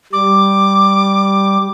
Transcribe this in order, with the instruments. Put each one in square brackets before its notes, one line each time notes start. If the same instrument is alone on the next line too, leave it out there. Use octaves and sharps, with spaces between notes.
[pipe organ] G3 [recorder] D6